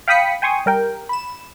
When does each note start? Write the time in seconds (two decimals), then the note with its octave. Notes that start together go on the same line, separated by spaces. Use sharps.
0.08 F5 G5 B5 D#6 B6 C#7
0.42 G5 G#5 C6 C#6 D#6
0.66 G3 A#4 G5
1.09 B5 E7